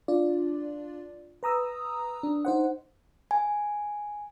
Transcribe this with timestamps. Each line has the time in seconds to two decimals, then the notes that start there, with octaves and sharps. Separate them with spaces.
0.08 D4 F4 D5
1.43 B4 A#5 D#6 E6
2.23 D4
2.45 D#4 C5 F#5
3.31 G#5